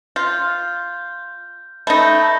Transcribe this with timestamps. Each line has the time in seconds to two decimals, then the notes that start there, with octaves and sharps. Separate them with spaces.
0.16 F4 G6
1.87 A3 D#4 B5 G6 A#6